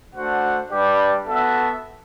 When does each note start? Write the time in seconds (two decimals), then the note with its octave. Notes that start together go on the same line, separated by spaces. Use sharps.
0.13 A3 D4 F#4 C5 F#5
0.70 G3 D4 G4 B4 D5
1.26 B3 F#4 A4 E5